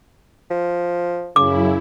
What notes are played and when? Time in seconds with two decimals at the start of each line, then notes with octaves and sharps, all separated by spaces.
0.51 F3
1.36 F#2 C#3 E4 D6